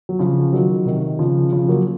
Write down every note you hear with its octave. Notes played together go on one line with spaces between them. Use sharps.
F#3
C#3 F3
D#3 F#3
C3 D#3
C#3 F3
C#3 F3
F#3 A#3